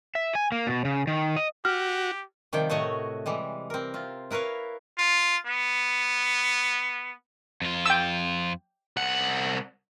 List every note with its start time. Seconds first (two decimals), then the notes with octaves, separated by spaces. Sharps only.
0.15 E5
0.35 G#5
0.52 A#3
0.67 B2
0.85 C#3
1.07 D#3
1.36 D#5
1.65 F#4 G4 F6
2.53 C3 D#3 F3 G3 G5
2.70 A2 C3 A3 F#4 C#5 D#5
3.26 E3 G3 G#3
3.70 C4 A#4
3.94 C3 F4
4.31 E4 A#4 B4 C#5 F5
4.98 F4
5.47 B3
7.62 F2 F4
7.86 G5 E6
8.97 C2 F#5